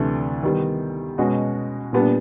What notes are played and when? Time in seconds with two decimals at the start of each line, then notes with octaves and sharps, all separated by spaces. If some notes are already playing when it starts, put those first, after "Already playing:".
Already playing: D2 C3 E3 A3 D4
0.43 D#3 G3 B3
1.18 B2 G#3 C#4 F#4
1.93 A#2 G3 B3 D4